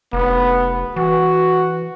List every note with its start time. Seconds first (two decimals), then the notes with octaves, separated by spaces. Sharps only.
0.13 F1 B3
0.96 E3 F#4